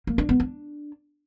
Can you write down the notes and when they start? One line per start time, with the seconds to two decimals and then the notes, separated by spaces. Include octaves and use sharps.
0.07 A#3
0.18 D4
0.29 B3
0.40 D4